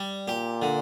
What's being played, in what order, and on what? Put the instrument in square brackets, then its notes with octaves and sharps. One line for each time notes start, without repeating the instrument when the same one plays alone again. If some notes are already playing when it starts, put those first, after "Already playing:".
Already playing: [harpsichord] G3
[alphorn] A#2 [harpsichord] G4
[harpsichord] D3